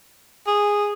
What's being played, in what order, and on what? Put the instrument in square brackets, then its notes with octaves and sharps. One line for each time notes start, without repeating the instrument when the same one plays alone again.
[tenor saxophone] G#4